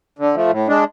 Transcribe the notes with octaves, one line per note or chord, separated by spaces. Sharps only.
D3
F3 A3
A2
G#3 D4